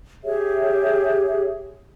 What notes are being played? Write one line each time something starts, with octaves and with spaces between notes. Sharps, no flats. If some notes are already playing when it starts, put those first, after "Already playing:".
G4 G#4 C#5 E5